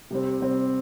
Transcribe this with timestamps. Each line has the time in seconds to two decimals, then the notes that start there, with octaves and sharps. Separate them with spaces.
0.11 C3 G3 C4
0.41 C3 G3 C4